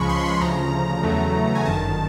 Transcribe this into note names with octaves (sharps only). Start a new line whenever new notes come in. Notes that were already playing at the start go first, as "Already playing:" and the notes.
Already playing: C#2 C#3 F3 G#3 B5 C#6
C6
B5
D2 C#3 F3 A#5
E2 C#3 F#3 A3
G#5
G1 F#2 D#3 A5